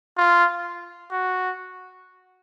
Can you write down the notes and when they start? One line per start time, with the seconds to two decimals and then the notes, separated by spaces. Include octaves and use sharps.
0.17 F4
1.11 F#4